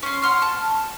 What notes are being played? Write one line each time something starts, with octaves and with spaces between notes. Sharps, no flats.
C#4 C6
F#5 C6 F6
A5